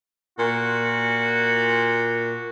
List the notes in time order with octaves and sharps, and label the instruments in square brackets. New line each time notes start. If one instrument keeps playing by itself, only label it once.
[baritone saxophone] A#2 [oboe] F#4